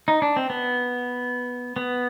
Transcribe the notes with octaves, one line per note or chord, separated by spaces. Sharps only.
D#4
D4
C4
B3
B3